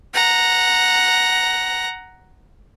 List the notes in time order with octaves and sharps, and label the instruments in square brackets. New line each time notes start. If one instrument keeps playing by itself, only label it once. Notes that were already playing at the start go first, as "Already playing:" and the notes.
[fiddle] F#5 A#5